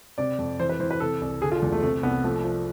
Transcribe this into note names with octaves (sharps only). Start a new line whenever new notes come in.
C3 D5
F2
E3 C5
B4
E3 C5
B4
C3 A4
C2
D3 G#4
F4
E2
A3
C3 A3
C2 B3
F3 A3
F3